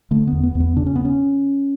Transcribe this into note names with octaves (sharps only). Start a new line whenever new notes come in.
D3 A3
E2 B3
B3
E2
B3
C#3 D4
C#4
B3
C#4